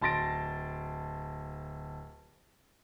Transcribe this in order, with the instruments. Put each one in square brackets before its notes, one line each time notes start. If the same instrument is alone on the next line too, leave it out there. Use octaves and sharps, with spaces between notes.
[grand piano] D1 A5 C6 A6 A#6 D7